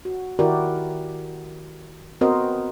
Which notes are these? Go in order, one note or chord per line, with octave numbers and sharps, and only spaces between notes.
F#4
D#3 E4 F#4 G4 A#4 D5
B3 C4 F#4 A#4 C5 D#5